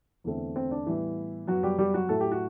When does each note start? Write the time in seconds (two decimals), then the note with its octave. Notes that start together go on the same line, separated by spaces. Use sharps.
0.24 E2 D3 A3 C4
0.56 C4
0.71 D4
0.86 A2 E3 G3 B3 E4
1.47 F#2 F#3 B3 F#4
1.63 G3 G4
1.78 G3 G4
1.94 F#3 F#4
2.09 A2 F#3 A3 A4
2.20 G4
2.31 F#4